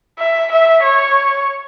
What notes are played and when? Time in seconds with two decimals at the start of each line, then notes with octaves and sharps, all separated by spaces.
0.19 E5
0.52 E5
0.83 C#5